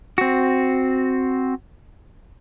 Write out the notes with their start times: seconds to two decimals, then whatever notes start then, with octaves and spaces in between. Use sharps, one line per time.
0.18 C4 F#4